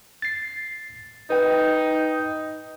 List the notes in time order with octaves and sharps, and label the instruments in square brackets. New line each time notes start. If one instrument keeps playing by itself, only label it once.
[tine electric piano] A6 C7
[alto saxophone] D#4 [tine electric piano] B4 G5